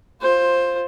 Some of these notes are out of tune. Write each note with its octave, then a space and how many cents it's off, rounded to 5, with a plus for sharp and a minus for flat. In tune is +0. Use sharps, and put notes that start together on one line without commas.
F4 +0 C5 +10